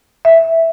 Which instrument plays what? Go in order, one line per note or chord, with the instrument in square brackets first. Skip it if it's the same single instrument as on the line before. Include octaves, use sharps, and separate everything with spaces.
[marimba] E5